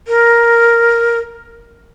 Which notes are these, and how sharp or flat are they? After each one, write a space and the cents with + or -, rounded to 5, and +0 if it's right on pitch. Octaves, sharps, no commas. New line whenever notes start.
A#4 +5